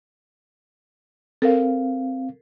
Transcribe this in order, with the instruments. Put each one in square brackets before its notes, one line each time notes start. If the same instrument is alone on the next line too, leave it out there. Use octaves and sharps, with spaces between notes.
[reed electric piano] C4 F5 [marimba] A4 A#4